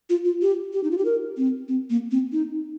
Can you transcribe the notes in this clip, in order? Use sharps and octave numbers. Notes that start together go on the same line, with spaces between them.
F4
F4
G4
G4
D#4
F4
G4
A#4
C4
C4
A#3
C4
D#4